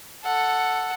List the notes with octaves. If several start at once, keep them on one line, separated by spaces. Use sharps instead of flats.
A4 F#5